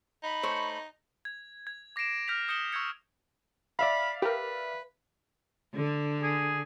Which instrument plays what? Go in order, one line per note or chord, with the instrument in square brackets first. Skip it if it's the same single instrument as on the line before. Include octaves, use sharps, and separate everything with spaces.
[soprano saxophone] D#4 [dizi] B5
[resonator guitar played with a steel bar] A3 C5 C#5
[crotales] G#6
G#6
D6 A#6 C7 D7 E7
F6 G6 A#6 B6 F7
D#6 G6 C#7 E7 G7
C#6 E6 G6 G#6 C#7
[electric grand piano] D5 E5 F5 [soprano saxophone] B5
[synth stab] G4 A#4 [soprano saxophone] B4
[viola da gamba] D3
[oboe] G#4